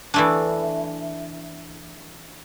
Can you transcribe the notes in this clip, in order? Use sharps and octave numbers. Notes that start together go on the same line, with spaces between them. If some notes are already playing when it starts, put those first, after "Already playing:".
E3 A3 D4